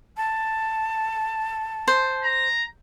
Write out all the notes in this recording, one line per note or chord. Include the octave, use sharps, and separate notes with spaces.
A5
C5
A#5